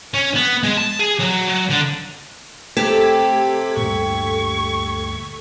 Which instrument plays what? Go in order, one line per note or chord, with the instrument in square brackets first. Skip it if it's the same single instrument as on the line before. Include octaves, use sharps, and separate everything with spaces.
[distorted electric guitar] C#4
B3
G#3
A5
G#4
F#3
F#3
D3
[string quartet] C3 [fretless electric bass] A3 [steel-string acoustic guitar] G4 [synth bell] A4 G#6 B6
[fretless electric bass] D2 G2 A#2 [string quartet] C#6